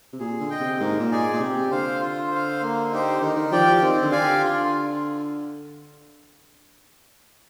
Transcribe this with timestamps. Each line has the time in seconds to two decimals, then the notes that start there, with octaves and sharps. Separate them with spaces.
0.13 C3
0.19 A#2 G#4
0.40 D3
0.50 D#5 G5
0.60 C3
0.80 G#2 A#3
1.00 A#2
1.11 D#4 G#4 D5 G#5
1.33 A#2
1.40 C3 G4
1.71 D3 C5 F5
2.01 F4
2.31 C5 F5
2.62 A#3
2.91 D#4 G4 C5
3.21 D#3 D#4
3.36 D#3
3.52 F3 G4 D5 G5
3.67 F3
3.82 D#3 C4
4.02 D3
4.12 G4 D5 F5 G#5
4.22 D3
4.41 F4